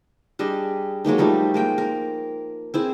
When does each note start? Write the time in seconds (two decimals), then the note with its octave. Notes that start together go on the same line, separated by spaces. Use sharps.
0.39 G3 D4 G#4 D#5
1.05 F#3 G#3 A#3 D#4
1.18 F3 G3 A3 D#4
1.54 G#3 A#3 G5
1.78 A#4
2.74 C4 E4 G#4